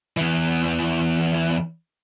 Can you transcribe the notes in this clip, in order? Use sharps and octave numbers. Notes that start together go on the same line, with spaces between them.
E2 E3